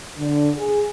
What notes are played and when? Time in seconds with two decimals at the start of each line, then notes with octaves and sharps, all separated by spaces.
0.17 D3
0.55 G#4